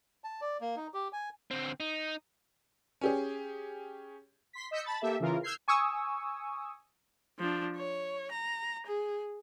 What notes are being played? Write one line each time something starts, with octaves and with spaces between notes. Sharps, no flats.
A5
D5
A#3
D#4
G4
G#5
D3 C4
D#4
C#4 G4 G#4
C6 B6
D#5 E6 G6 B6 C#7
A5 B5 A6
A#3 G4 A4 E5
C#3 E3 F4 A#4
E6 F6 G6 G#6 C7
G#5 C#6 D#6 E6
F3 D4
C#5
A#5
G#4